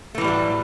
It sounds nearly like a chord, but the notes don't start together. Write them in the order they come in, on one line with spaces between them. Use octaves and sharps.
A3 E3 A2 G3 F#3